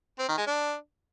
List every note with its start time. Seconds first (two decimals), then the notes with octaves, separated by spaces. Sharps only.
0.19 C4
0.28 D#3
0.38 G#3
0.47 D4